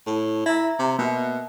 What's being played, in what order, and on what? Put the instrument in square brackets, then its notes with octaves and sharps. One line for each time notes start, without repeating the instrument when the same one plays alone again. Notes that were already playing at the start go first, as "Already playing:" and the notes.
[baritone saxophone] A2
[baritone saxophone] E4 [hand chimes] E5 A#5
[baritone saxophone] C3
[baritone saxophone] B2 [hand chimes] A#3